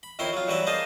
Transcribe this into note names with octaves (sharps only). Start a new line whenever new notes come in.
B5
F2 D#3 C4 E4 C#5 C6
F#3 F4
G2 E3 F#3 C4 B4 E5
A#3 D#4 G#4 C5 D#5 A5